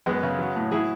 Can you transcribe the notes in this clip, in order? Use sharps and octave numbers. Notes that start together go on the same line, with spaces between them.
F#2 G#3 B3
C#3
F#3
A2
F#3 E4 G#4